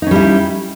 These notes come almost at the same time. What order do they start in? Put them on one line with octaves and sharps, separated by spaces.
D#4 C#4 G3 E4